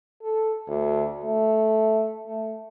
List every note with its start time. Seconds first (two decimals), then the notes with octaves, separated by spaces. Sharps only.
0.22 A4
0.68 D2
1.25 A3
2.27 A3